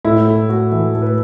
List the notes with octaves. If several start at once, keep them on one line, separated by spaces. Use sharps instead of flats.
A2 E4
A2
A3 F#4
E3
A2 A4
B4